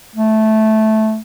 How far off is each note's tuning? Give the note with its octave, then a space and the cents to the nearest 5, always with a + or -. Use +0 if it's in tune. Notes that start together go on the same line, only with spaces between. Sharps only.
A3 -10